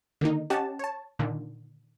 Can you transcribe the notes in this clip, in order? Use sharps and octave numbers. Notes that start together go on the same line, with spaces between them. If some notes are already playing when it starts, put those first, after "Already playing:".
D3 D#3 A#3 D#4
C#4 G4 D#5 F#5 A5
C#5 A5
A#2 D3 D#3